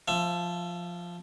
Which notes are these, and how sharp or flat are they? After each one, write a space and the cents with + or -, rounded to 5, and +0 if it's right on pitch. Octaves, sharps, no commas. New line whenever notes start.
F3 +0 E5 +25